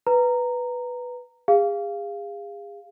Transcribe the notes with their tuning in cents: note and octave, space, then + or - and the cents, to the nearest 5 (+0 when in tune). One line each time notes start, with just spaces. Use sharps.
B4 +0 A#5 -10
G#4 -35 F5 -10